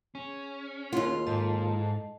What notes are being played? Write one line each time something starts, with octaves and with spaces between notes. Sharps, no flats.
C#4 G#4
D#2 F4 F#4 G#4 C#5
G#2 A4 D#5 A5